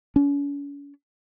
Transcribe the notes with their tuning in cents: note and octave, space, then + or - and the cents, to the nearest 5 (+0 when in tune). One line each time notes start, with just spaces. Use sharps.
C#4 +40